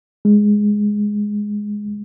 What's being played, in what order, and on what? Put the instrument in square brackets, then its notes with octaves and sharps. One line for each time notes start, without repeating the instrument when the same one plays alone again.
[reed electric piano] G#3